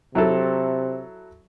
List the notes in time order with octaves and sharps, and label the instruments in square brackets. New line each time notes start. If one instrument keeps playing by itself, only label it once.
[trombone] C3 [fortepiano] F#3 E4 A4